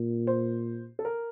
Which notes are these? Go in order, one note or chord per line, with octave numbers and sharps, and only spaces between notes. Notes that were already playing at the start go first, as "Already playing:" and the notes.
Already playing: A#2
C5
A4
A#4